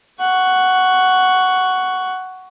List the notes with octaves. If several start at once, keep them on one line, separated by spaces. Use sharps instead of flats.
F#5 C#6